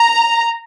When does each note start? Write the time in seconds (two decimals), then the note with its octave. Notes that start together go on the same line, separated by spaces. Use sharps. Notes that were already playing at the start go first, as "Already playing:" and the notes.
Already playing: A#5